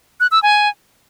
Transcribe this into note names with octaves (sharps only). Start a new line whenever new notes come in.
F#6
E6
G#5